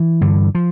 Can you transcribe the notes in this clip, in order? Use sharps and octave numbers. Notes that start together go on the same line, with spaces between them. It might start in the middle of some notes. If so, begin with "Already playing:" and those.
Already playing: E3
G2 D3
F3